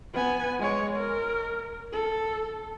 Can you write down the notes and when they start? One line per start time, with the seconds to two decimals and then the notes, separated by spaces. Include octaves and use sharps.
0.13 B3 G#5
0.59 G#3 C#5
0.97 A#4
1.92 A4